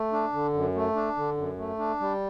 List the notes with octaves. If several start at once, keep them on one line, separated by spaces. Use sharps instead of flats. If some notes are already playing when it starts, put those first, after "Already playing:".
Already playing: A3
D4
D3
F#2
A3
D4
D3
F#2
A3
D4
G3